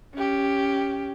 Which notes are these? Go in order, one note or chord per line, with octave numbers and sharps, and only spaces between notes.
C#4 G4